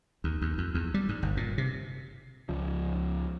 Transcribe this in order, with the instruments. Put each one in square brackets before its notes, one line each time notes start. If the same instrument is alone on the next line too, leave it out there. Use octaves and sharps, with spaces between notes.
[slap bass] D#2
D#2
F2
E2
G3
G#2
G1
A#2
C3
[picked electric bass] C#2 F3